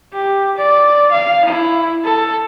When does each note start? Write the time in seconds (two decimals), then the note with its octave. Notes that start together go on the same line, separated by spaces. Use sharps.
0.14 G4
0.57 D5
1.12 F5
1.46 E4
2.05 A4